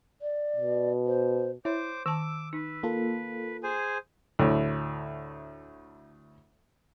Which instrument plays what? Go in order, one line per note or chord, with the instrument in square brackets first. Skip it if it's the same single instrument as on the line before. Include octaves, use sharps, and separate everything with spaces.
[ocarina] D5
[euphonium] B2
[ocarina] C5
[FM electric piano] E4 [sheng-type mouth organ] C5 D6 [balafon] C#5
[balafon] D#3 A5 [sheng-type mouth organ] D6 [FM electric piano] E6
[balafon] D#4 [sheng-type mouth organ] B4
[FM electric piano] A#3 F4 A4
[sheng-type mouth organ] G#4 C5 G#5
[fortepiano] D2 A2